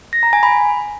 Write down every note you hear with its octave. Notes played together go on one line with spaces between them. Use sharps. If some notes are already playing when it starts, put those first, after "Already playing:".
A#6
A#5
G#5
B5